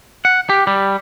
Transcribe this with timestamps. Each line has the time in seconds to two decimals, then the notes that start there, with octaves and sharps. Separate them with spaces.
0.25 F#5
0.50 G4
0.67 G3